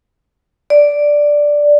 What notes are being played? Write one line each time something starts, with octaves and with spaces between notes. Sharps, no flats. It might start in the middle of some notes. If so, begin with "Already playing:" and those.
D5